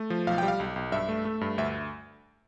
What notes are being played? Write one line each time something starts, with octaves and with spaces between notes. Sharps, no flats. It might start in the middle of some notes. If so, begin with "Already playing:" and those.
Already playing: A3
F3
B1 F5
G3 G5
F5
B1
B1
G2 E5
A3
A3
G2
D2 E5